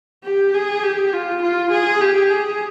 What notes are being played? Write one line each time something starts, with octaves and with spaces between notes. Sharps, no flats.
G4
G#4
G4
F4
F4
G#4
G4
G#4